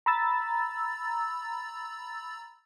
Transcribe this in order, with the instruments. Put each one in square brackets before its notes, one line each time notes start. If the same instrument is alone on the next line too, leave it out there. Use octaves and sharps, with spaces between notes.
[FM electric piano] A#5 B5 E6 A6